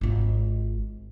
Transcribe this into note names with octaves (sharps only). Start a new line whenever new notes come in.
G#1 F4